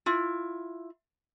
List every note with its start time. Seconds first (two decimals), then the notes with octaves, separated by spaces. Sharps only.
0.06 E4 F4